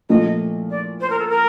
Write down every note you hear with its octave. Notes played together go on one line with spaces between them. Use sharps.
A#2 F3 A3 D#5
D5
C5
A#4
A4
A#4